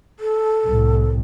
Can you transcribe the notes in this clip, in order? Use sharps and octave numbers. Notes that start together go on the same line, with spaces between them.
A4
C2 A2